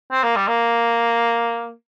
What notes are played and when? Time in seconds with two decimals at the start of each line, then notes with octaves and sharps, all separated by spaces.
0.11 C4
0.23 A#3
0.36 G3
0.48 A#3